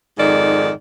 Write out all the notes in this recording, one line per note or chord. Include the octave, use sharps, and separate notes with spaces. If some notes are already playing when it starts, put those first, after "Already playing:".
F2 G#2 D#3 D5